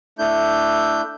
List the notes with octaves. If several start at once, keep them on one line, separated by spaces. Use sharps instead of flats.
A3 D4 E4 G6